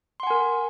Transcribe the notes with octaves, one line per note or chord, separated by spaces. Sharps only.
A#4 F#5 G#5 C6